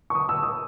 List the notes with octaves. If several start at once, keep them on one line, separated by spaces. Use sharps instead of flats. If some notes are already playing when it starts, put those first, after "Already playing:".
C#6
D#6
E6
D#6